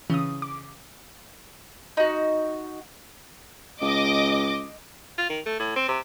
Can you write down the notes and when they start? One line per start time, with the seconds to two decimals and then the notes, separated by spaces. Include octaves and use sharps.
0.10 C#3 E3 D#6
0.42 D6
1.97 D#4 F#4
3.82 C#2 D#5 D6
5.18 F4
5.30 D#3
5.46 A3
5.60 A2
5.76 C4
5.88 C3